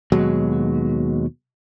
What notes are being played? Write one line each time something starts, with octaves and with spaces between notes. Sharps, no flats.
D#2 B2 F#3 G#3